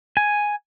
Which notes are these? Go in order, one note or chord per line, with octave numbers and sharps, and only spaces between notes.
G#5